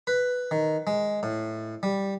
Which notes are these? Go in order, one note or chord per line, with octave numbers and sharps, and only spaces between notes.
B4
D#3
G#3
A2
G3